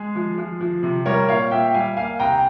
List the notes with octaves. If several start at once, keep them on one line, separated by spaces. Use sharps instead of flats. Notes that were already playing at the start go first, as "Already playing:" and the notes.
Already playing: G#3 G#4
F3
F3
F3
C3
G3 A#4 C#5
A#2 C#5 F5
A#2 E5 G5
G3 F5 G#5
A#3 F5 G#5
C2 G5 A#5